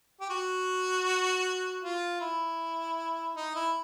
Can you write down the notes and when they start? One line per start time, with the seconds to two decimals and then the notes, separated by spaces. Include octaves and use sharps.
0.21 G4
0.30 F#4
1.82 F4
2.21 E4
3.36 D#4
3.55 E4